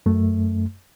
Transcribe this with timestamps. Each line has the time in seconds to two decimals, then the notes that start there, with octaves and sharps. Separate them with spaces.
0.06 F#2 A3